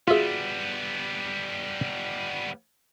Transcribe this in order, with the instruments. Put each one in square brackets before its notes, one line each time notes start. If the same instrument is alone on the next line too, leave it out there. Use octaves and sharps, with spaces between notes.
[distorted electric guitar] G3 B3 [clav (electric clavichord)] F4 E5 [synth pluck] F#4 G#4